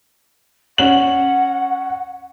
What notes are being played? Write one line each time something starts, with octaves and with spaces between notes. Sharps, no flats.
C#4 F#5 F#7